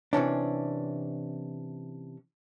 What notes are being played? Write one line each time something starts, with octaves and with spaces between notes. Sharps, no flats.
C3 E3 C#4 D4